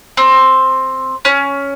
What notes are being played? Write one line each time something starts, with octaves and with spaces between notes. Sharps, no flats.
C4
C#4